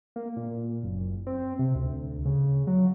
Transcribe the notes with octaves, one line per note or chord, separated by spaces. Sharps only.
A#3
A#2
F#1
C4
C3
D2
C#3
F#3